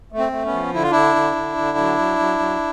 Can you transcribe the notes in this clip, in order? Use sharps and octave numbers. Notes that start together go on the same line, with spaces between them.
A3
C4
A3
B3 C#4
F3
D3 E4
F4
D3 D4 E4
D3
D3
D3
F#3
F#3
F#3
F#3